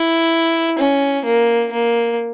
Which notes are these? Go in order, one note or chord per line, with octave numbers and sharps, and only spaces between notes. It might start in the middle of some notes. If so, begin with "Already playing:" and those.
Already playing: E4
C#4
A#3
A#3